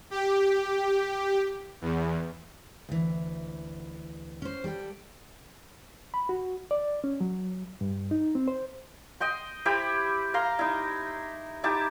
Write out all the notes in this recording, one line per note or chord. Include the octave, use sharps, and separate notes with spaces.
G4
E2
D2 E3
C#4 C5
G3 A4 C5 G5
B5
F#4
D5
C#4
F#3
G2
D#4
C4
C5
D#5 G5 C6
E4 G4 C5 B5
F5 A#5 C6
D#4 E4
D#4 E4 G4 A5